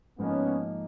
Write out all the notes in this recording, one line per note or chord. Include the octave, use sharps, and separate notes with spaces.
G#2 F3 A#3 B3 C#4 D#4